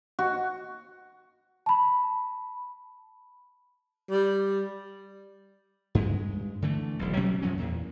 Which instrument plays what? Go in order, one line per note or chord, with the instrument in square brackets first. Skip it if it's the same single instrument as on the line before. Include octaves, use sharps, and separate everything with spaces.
[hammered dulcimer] F#4
[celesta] A5 B5
[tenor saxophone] G3
[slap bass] G2 G#3
D3 E3 A3
D#1 B1
B2 F#3 G3 C#4
F#2 F3 F#3 C#4
E2 A#2